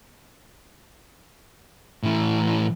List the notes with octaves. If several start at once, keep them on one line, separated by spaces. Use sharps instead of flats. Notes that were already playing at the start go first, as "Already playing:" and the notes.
A2 E3